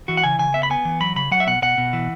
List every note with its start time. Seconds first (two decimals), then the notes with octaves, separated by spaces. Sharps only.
0.08 E3 F#4
0.17 F#5
0.24 C#3 G#5
0.39 C#3 G#5
0.54 B3 E5
0.63 B5
0.70 B3 G#5
0.85 E3
1.01 F#3 B5
1.16 C#3 B5
1.31 F#3 F#5
1.40 E5
1.47 B2 F#5
1.62 B2 F#5
1.78 B2
1.93 E3